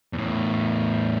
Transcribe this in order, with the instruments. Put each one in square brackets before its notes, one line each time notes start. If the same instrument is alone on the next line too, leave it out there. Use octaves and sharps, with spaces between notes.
[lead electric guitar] E2 A2